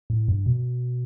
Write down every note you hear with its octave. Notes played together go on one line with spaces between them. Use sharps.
A2
G2
B2